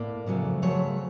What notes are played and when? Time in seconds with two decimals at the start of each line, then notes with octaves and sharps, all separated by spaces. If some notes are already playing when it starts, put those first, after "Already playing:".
Already playing: A2 A#3 D5
0.26 F2 C#3 F#3 A3
0.62 F2 C#3 F#3 A3 C#5